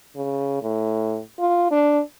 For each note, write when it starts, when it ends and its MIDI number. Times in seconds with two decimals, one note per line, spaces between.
0.16 0.58 49
0.63 1.19 45
1.39 1.68 65
1.71 2.00 62